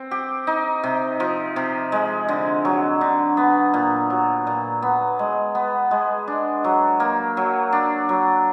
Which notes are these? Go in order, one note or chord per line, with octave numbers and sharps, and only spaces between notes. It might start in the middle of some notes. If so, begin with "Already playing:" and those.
Already playing: C4
G4
D#4
C3
F3
C3
G#3
D3
F#3
D3
B3
A#2
F#3
A#2
B3
G#3
B3
G#3
D4
F#3
A#3
F#3
D4
F#3